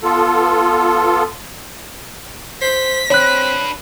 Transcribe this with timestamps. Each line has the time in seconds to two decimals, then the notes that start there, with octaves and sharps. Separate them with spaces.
0.03 B3 F4 A4
2.61 C5 B6
3.10 C4 D4 B4 C#5 F#6